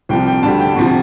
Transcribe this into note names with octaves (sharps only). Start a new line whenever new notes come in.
C2 C3 F3 G5
G5
D2 D3 G3 A5
G5
D2 C3 F3